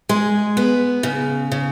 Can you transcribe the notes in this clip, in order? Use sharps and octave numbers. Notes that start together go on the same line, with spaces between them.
G#3 G#4
B3
C#3
C#3